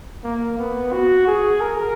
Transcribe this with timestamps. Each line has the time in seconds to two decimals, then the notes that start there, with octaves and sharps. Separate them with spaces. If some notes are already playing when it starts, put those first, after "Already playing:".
0.24 A#3
0.58 B3
0.93 F#4
1.27 G#4
1.61 A#4